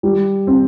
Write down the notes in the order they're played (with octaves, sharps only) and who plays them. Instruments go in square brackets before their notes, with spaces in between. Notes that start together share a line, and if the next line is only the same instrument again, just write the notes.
[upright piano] G3
C4